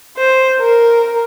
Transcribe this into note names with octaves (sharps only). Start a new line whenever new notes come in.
C5
A#4